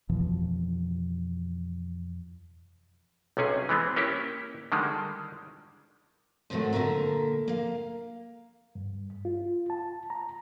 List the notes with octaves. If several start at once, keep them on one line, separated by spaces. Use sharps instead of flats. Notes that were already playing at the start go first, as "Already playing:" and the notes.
F2 B2 E3 F3
B1 C3 C#4 G#4
E3 G#3 B3 C4
A#3 C#4 E4 G4
D3 D#3 G3 G#3
G#2 C3 D#3 F#3 A3 F#4
A#2 D3 A#3 A#4 E5 A#5
A#3 F5
G2
F4
A5
A#5